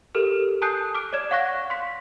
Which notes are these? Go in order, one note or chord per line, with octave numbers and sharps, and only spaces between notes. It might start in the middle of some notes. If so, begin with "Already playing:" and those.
G4 A4 A#4 F6
G#5 A5 D#6 F#6 G6 C7
D6 F6 D7
C#5 D5 G#6 E7
F5 F#5 C#6 F#6 A#6
C6 B6